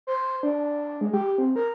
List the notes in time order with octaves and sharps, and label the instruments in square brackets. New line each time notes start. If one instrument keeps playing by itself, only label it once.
[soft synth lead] C5
D4
G#3
G4
C4
A#4